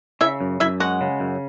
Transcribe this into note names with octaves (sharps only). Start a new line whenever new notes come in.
C#3 E4 E5
F#2
F#2 E4 E5
G#3 F#4 F#5
C#3
F#2